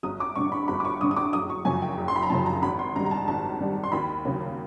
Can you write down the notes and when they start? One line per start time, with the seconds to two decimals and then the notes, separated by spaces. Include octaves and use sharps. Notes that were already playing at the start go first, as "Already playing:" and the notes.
0.03 G1 D#6
0.20 D6
0.35 G2 D3 C#6
0.52 B5
0.68 G1 B5
0.80 D6
0.85 C#6
1.01 G2 D3 D#6
1.11 D#6
1.16 D6
1.33 F#1 D#6
1.50 C#6
1.65 F#2 C#3 F3 G#5
1.82 G5
1.98 F#1
2.08 C6
2.16 B5
2.23 A#5
2.30 F#2 C#3 F3 A5
2.46 A#5
2.62 G#1 B5
2.79 C6
2.96 G#2 D#3 G3 A#5
3.06 A#5
3.11 A5
3.28 G#1 A5
3.60 G#2 D#3 G3
3.84 C6
3.92 D#2 B5
4.25 C#3 F#3 A#3